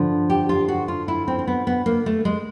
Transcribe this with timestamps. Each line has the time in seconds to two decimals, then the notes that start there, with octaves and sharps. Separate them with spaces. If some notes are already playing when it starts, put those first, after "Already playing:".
Already playing: G2 D3 F3
0.30 G4
0.49 F4
0.68 F#4
0.88 F4
1.08 E4
1.28 C4
1.39 C4
1.47 B3
1.67 B3
1.86 A#3
2.06 A3
2.25 G#3